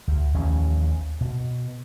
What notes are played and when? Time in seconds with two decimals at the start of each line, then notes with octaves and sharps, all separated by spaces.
0.07 D2
0.34 A1 D#2 F3 C#4
1.21 B2